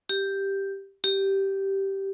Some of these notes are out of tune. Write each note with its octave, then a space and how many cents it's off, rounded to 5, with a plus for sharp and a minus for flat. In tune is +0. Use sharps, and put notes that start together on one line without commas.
G4 +0
G4 -10